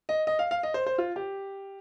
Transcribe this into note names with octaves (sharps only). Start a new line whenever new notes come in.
D#5
D#5
F5
F5
D#5
C5
C5
F4
G4